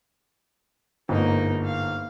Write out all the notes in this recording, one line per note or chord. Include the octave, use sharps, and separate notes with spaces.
G1 G#2 A#3 D#4
F5